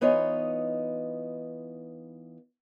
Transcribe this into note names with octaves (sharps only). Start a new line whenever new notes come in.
E3 B3 D#4 F4 C#5 D#5